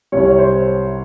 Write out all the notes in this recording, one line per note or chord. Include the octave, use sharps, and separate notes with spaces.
C2 C3 G3 C#5
C#5
C5